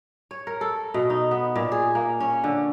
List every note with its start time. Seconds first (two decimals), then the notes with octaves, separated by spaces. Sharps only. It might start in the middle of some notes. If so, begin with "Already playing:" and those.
0.31 C#5
0.47 A#4
0.61 A4
0.94 B2
1.10 D#4
1.31 B3
1.56 A#2
1.72 G#4
1.95 A#3
2.20 C#4
2.44 D3